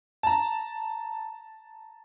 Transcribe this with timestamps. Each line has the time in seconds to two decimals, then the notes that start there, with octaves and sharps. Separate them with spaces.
0.23 A5 A#5